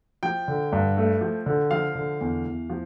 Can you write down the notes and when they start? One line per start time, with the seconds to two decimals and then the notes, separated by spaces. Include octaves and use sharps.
0.23 F3 G5
0.48 D3
0.72 G2
0.97 A3
1.21 F3
1.46 D3
1.71 F3 F5
1.95 D3
2.21 E2
2.46 E2
2.70 F3